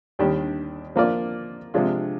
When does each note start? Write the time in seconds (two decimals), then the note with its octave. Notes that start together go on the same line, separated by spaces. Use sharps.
0.19 D#2 D#3 G3 D4 G4
0.96 F3 A#3 F4 A#4 D5
1.74 C3 F3 G#3 D4 F4